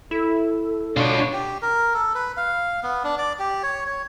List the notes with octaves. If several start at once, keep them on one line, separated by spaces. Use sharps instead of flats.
E4 A4
B2 D4 F4 C#5
G4
A#4
A4
B4
F5
B3
D4
D5
G4
C#5
C#5